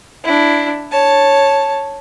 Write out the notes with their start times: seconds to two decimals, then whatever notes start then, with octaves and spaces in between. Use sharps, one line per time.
0.24 D4 E4
0.91 C#5 A5